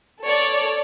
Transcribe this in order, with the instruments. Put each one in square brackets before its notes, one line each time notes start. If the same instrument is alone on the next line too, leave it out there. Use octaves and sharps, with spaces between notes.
[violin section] A4 C#5 D5